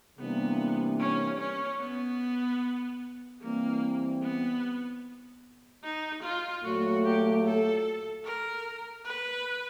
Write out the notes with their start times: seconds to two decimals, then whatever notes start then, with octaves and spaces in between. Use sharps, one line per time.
0.19 C3 E3 G3 A#3 B3 D4
1.00 C#4
1.39 C#4
1.80 B3
3.41 E3 G3 A#3 C4 E4
4.22 B3
5.84 D#4
6.23 F4
6.64 A#2 F#3 A3 F#4
7.04 G4
7.45 A4
8.25 A#4
9.05 B4